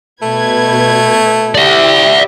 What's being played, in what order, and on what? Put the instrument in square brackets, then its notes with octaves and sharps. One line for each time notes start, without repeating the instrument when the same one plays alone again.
[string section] B2 B4 G#6 [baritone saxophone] A3
[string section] E4 G4 [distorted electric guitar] D5 E5